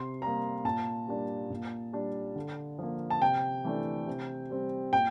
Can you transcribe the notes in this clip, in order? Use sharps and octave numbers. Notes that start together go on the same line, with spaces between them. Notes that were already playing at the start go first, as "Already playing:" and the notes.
Already playing: C3 C6
G3 A#3 A#5
A#2 A5
G3 A#3 D4
A#2
G3 D4
D3
F3 A#3
A5
C3 G5
E3 A3 D4
C3
G3 C4
A#2 G5